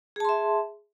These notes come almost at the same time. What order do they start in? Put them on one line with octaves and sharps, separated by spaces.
G#4 A5 C6 E5